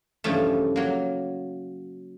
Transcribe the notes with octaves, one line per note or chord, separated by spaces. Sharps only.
G2 C#3 E3 F3 G3 A3
F#3 A#3